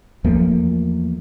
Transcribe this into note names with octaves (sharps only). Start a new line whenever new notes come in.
E2 F3 A3 A#3